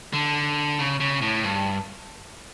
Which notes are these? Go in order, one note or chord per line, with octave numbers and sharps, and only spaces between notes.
D3
C#3
C#3
A2
G2